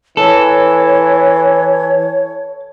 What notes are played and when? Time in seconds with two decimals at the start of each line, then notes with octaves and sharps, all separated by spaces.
0.17 E3 A4 C#5